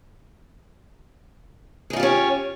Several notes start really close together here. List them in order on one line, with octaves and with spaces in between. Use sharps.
G#4 D#4 F4 G4 C#4